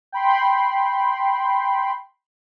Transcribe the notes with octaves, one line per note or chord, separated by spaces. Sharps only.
G5 B5 C6